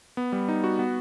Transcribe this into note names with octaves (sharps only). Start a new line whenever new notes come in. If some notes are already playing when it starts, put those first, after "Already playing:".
B3
G3
D#4
F#4
B3